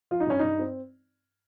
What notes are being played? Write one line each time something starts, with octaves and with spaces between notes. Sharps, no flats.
F3 F4
D#4
G2 C#4
G2 D#4
C4